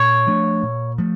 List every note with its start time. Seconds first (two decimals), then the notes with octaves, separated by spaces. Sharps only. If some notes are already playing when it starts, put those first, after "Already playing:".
Already playing: A#2 C#5
0.27 F3 A3 D4
0.63 A#2
0.98 F3 A3